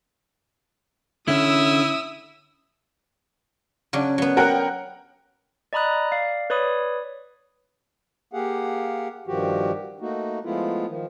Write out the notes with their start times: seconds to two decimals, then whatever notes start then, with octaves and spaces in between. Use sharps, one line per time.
1.28 D3 C#4 E4 D#6 E6
3.93 C#3 F#3 D4
4.18 F#3 B3
4.37 A#4 F#5 G5
5.73 D5 D#5 A#5 B5 D#6 F#6
6.12 D5 F5
6.50 B4 C#5 D5 B5 D#6
8.33 A#3 G4 G#4 F5 F#5
9.27 G2 D#3 F3 F#4 G4
10.01 A3 A#3 D#4 F#4
10.44 F3 G#3 A3 B3 E4 F4
10.87 D#3 F3